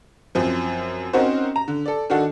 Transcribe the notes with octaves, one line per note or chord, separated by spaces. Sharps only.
F#2 F3 C4
C4 C#4 D#4 F#4 A#4 C5
A#5
D3
A4 D5
D#3 D4 F#4 A4